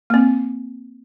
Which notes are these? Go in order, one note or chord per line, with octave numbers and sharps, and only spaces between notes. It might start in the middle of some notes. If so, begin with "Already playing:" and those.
A#3 C4